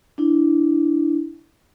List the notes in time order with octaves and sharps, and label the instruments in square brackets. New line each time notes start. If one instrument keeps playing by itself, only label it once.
[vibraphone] D4 E4